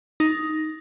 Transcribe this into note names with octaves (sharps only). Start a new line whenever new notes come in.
D#4